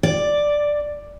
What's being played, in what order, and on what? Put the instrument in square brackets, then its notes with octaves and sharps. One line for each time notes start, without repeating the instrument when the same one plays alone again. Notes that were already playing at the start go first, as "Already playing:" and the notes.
[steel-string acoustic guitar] D5